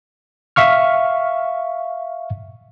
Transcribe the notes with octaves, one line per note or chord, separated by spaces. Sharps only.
E5 F5 C#6 F6